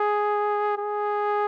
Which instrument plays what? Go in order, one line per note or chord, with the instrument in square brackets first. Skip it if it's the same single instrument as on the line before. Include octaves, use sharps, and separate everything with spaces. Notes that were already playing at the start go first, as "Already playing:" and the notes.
Already playing: [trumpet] G#4
G#4